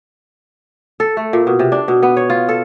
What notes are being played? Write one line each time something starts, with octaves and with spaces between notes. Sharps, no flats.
A4
A3
A#2
B2
C3
D4
B2
B3
C#5
F4
A4